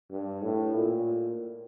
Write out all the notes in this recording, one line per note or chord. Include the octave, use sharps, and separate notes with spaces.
G2
A2
A#2